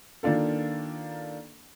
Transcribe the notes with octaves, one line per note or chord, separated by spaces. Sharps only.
D#3 A#3 D4 F4 A4